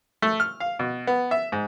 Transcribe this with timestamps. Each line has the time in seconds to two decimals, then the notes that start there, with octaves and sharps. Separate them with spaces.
0.22 A3
0.40 F6
0.60 F5
0.79 B2
1.07 B3
1.31 E5
1.52 G#2